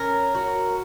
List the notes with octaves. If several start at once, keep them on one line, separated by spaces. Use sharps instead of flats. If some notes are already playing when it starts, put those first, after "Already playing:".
Already playing: C#4 A#4
F#4